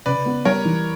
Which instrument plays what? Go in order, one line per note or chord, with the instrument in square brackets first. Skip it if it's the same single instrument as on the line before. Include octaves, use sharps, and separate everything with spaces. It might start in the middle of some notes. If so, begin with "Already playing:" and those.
[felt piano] C#3 [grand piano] B4 D5
[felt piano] B3
[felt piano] G3 [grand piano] A#4 C#5
[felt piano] E3